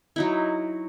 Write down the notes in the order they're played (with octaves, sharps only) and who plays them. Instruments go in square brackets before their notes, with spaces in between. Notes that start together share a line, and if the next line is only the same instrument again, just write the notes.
[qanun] F#3 D#4 E4